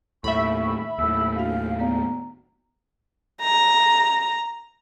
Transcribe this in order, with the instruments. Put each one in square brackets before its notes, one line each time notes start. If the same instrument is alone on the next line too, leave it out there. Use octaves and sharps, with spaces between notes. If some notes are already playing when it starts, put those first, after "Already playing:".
[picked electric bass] D#2 A2 [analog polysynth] E5 B5 [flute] C#6
[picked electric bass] D#2 A2 [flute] E6
[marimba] D4 F#4 [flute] F5
[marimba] B3 D5 [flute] A#5
[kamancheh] A#5